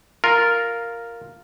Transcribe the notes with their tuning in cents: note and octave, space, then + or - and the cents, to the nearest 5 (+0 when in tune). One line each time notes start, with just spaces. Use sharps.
F4 +0 A#4 -5